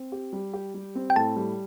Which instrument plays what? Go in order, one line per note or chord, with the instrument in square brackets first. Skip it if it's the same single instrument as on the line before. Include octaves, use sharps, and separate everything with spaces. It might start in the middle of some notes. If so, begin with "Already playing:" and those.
Already playing: [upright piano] C4
G4
G3
G4
G3
C4
[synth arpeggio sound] G5
[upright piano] A2 [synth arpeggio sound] A5
[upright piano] G3